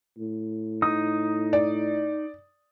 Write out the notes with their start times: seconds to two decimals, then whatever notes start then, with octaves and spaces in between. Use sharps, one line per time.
0.18 A2
0.82 D#4 D#6
1.53 D5